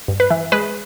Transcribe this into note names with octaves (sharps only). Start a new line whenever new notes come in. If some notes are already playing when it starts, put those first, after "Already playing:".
G2
B4
E3
G#3 B4